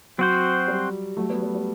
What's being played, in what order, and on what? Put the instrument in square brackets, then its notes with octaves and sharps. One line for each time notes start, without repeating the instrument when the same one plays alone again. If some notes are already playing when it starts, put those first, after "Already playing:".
[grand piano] F#3 [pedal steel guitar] C4 F#4 C5
[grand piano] G3
F#3 A3
G3 B3
G3
G3